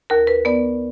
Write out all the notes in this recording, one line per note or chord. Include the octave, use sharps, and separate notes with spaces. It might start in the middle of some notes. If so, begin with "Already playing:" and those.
D#2 A#4
B4
B3 D5